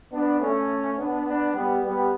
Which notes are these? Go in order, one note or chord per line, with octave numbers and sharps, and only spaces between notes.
B3 D4
A3 C#4
B3 D4
B3 D4
G3 B3
G3 B3